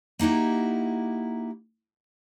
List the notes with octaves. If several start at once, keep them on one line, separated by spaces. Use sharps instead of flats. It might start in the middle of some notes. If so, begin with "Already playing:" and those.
A#3 D#4 E4 F#4 G4